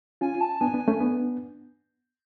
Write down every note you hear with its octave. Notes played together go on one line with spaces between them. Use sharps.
C#4 F4 G#5
A5
B3 D4 G#5
B3 D4
A3 C#4
B3 D4